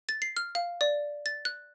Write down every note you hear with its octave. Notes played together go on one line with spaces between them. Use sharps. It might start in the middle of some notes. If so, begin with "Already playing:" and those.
A6
C7
F6
F5
D5
A6
F#6